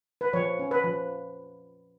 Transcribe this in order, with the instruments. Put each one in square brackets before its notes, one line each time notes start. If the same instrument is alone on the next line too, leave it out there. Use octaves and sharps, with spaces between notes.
[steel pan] B4
F3 C#5
C#4
B4
F3